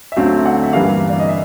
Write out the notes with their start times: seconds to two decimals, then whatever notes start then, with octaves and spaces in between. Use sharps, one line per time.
0.12 E5
0.16 D2 D3 F#3 A3 C4 F5
0.46 F#5
0.63 E5
0.73 G2 E3 G3 A#3 F5
1.09 D5
1.20 D#5
1.29 E5